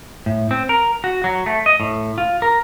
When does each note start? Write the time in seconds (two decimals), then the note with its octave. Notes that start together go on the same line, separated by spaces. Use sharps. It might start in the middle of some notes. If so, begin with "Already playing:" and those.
0.26 A2
0.51 C4
0.69 A#4
1.04 F#4
1.24 F#3
1.46 A3
1.66 D#5
1.80 A2
2.18 F4
2.42 A#4